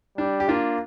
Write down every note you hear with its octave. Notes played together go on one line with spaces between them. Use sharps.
G3 D4
G4
A#3 D4 F4